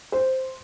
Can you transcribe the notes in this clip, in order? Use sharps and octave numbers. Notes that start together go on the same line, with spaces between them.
C5